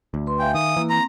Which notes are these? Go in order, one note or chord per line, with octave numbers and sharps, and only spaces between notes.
D2
B4 C6
E5 F5 G5 G#5
D#3 D#6
E3 A#3
C4 A#5